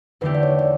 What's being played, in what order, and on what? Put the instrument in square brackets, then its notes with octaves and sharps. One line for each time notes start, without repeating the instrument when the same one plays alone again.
[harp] E2 D3 A3 E4 G4 [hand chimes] B4
[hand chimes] D5
C#5
D5